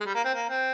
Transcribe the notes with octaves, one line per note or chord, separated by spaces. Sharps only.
G#3
G3
A#3
C4
A#3
C4